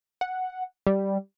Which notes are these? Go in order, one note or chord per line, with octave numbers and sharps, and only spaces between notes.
F#5
G3